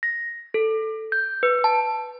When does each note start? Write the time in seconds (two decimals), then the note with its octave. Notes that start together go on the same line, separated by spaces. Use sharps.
0.03 A#6
0.54 A4
1.12 G6
1.43 B4
1.64 A5